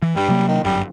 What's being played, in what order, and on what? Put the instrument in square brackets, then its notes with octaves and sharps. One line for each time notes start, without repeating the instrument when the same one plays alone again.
[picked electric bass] E3
[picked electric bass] G2 [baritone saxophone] G3
[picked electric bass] C3 F#3 A#3
[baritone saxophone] D#3
[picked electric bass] G1 F#2 [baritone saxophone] G3